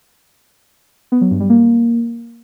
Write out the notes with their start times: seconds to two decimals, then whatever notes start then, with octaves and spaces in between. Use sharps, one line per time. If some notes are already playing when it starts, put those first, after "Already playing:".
1.12 B3
1.21 F#3
1.31 G2
1.40 G3
1.50 A#3